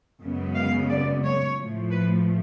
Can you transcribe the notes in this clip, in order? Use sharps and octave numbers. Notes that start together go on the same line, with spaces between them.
F#2 C#3 G#3 B3
F5
D5
C#5
A2 F3 A3
B4